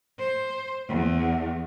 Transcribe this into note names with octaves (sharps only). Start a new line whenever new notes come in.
C5
E2